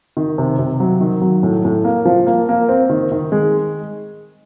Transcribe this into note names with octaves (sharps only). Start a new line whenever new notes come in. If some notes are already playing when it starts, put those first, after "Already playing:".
D#3
C3
C3
F#3
D#3
F#3
A2
A2
A#3
F3
A#3
A#3
C4
D#3
D#3
G#3